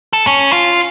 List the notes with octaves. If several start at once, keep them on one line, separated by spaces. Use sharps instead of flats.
A4
C#4
F4